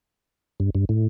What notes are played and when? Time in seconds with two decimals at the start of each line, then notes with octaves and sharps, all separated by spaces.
0.60 G2
0.75 G2
0.89 A2